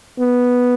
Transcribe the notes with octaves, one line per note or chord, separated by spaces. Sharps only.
B3